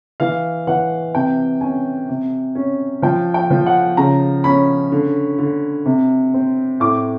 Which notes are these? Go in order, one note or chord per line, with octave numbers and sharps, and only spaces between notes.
E3 F5
E3 F#5
C3 G5
C#4 G#5
C3
C#4
F3 G5
G5
F3
F#5
C#3 A#5
C#4 B5
D3
D3
C3
C4
A2 D6